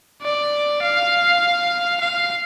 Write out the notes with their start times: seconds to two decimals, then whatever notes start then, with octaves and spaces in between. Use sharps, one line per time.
0.23 D5
0.82 F5
2.01 F5